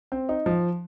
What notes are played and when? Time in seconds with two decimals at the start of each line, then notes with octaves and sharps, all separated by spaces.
0.12 C4
0.29 D#4
0.46 F3